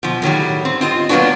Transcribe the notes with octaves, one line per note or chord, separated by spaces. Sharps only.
B2 F3
A2 D#3 F#3 G3
C4
C4 F4 D#5
F#3 G3 A#3 B3 D4 F#4